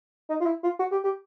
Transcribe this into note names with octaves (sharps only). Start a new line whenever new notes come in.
D#4
F4
E4
F4
F#4
G4
G4